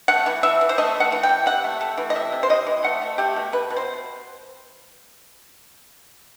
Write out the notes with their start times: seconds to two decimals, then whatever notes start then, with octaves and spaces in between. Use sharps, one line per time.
0.08 A3 F#5
0.26 E3
0.43 E3 E5
0.61 E3
0.69 C5
0.78 A3 D#5
0.95 A3
1.00 F#5
1.12 E3
1.23 G5
1.29 E3
1.46 C3 F#5
1.64 A3
1.81 A3
1.98 E3
2.10 D#5
2.15 C3 E5
2.32 C3
2.43 C5
2.49 E3 D#5
2.67 E3
2.84 A3 F#5
3.02 A3
3.18 A3 G4
3.36 B2
3.52 B2 B4
3.70 B2
3.77 C5